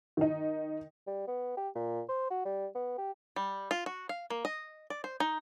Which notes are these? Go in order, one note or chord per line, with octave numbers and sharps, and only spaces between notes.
D#3 D#4
G3
B3
G4
A#2
C5
F#4
G3
B3
G4
G3
F4
F#4
F5
A#3
D#5
D5
C5
D#4